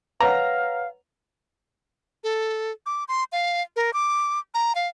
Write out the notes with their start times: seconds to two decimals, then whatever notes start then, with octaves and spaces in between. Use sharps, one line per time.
0.20 B4 C#5 F5 F#5 A#5
2.24 A4
2.86 D6
3.08 C6
3.32 F5
3.76 A#4
3.93 D6
4.54 A#5
4.75 F5